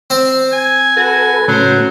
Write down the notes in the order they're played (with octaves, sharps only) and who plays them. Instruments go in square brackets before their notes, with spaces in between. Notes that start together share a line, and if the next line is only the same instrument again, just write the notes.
[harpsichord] C4 C5
[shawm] G#5
[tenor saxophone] F#4 [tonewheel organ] A4 B4 [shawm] G#5
[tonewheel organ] A2 C#3 [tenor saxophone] F#3 [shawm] C5